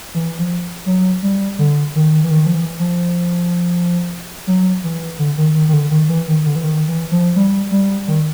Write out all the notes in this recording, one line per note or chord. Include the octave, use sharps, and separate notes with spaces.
E3
F3
F#3
G3
D3
D#3
E3
D#3
F3
E3
F3
F#3
E3
D3
D#3
D#3
D#3
D3
D#3
E3
D#3
D3
E3
D#3
E3
F3
G3
G3
D#3